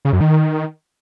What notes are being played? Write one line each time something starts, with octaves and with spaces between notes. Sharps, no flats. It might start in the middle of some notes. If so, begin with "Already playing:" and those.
C#3
F#2
D#3